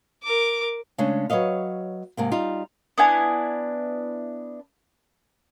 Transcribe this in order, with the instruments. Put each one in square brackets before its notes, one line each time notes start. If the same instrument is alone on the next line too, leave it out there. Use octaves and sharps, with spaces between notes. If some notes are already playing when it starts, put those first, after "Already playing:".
[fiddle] A#4 D6
[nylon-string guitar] C#3 G#3 A3 C#4 D4
F#3 B4 C#5 D#5 F5
G#2 C3 A#3
G3 D#4 F4
[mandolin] B3 D4 E4 G#5